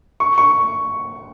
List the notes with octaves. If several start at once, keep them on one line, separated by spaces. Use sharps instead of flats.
C#6
C#6